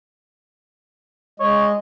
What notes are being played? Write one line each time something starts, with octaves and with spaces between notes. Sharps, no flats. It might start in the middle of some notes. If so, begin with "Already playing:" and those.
G#3 C#5 D#5